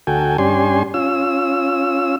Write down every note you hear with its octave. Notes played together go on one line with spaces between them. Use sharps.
D2 F#4 A4 G5 G#5
G2 C#4 D4 G4 G#5 C6
C#4 F4 E6